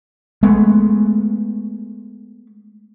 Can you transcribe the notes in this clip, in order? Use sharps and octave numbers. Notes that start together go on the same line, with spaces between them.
G#3 A3 B3